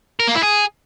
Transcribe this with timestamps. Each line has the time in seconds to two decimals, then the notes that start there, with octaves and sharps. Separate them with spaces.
0.20 A#4
0.28 A#3
0.36 E4
0.43 G#4